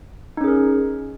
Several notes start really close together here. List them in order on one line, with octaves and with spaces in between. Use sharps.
D#4 C#4 G#4 A#4